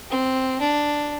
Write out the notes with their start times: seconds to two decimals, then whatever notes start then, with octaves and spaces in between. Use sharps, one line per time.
0.10 C4
0.60 D4